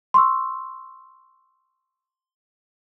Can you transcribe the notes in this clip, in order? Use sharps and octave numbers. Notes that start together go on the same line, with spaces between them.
C6 C#6 E6